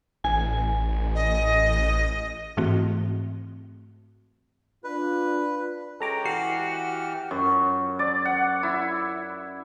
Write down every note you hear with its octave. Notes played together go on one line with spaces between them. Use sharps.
A1 G#5
D#5
G#2 E3 A3 C4 F#4
D4 F4 B4
G#3 C#4 G4 A4 A#5 D6
E3 F#4 G4 F6 C7
F#2
D5
F#5
E4